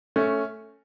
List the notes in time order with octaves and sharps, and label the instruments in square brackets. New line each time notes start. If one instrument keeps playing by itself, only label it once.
[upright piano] A3 C#4